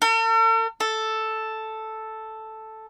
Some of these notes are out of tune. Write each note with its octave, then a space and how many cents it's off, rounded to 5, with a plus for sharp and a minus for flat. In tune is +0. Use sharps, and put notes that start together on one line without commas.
A4 +45
A4 +0